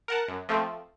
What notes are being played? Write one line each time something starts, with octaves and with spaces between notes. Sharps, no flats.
A#4 F#5 A5
F#2
F3 A3 C4